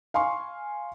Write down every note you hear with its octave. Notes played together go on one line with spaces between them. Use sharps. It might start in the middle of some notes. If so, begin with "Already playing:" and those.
F5 G#5 C6 C#6